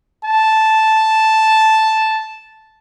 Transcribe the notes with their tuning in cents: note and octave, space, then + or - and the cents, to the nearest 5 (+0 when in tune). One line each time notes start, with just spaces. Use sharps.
A5 -5